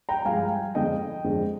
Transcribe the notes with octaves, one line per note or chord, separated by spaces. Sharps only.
G5 A#5
G2 F3 G#3 F5 G#5
F2 D3 G#3 D4 D#5 G5
F2 D3 G#3 D4